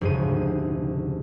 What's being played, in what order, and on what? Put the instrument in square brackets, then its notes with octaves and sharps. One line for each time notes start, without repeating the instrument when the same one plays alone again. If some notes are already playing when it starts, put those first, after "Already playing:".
[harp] F1 D2 G#2 C#3 C5 D#7